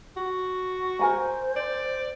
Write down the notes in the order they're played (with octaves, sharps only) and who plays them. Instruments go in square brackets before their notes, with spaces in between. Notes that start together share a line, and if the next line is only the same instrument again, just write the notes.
[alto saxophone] F#4
[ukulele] A#4 G#5 A#5 [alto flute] C5
[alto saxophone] D5